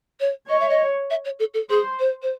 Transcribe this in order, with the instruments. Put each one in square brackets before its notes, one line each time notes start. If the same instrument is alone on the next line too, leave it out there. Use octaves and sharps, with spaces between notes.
[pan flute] C#5
[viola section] C#5 [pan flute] D#5
[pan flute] E5
D#5
E5
C#5
A4
A4
[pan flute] G#4 [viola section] C5
[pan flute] C5
C5